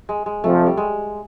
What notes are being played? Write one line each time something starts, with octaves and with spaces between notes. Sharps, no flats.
G#3
G#3
F2 C3 F3 A3
G3
G#3